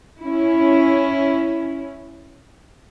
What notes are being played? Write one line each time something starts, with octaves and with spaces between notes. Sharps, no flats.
C#4 E4